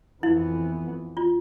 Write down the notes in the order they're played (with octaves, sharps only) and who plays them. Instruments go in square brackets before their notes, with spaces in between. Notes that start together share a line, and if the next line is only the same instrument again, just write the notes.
[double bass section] F2 E3 B3 [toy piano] E4
[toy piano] F4